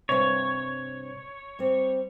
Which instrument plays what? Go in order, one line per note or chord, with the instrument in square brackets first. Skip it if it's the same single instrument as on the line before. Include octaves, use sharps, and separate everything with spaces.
[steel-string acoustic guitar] G2 C3 [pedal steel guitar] C#5
[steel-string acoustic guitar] G3 C4